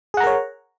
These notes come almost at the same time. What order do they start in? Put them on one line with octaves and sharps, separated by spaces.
G#4 F#5 A#5 A#4 C#5